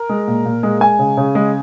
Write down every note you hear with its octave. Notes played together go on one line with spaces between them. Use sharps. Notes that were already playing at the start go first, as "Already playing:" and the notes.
Already playing: A#4
G#3
A#2
A#2
G#3
G#3 G#5
C#3
C#3
G#3